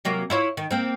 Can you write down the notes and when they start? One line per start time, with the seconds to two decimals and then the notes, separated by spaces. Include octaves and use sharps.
0.05 C3 F#3 A#3
0.30 E4 F4 C#5
0.57 D#3
0.71 A#3 C4